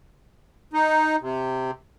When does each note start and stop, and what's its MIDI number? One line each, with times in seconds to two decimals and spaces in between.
0.73 1.16 63
1.21 1.71 48